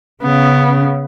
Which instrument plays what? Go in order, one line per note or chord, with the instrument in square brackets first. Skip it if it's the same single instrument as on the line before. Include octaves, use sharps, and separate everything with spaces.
[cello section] C#3 [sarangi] B3